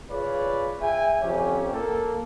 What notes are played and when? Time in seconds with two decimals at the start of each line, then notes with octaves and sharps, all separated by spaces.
0.11 F4 G#4 B4 C#5 D5 F5
0.81 G#4 E5 G5 G#5
1.21 F2 C#4 G4
1.72 A#3 A4